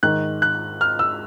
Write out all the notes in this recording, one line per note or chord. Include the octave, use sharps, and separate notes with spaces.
G#2 D#3 G#3 F#6
F#6
F6
E6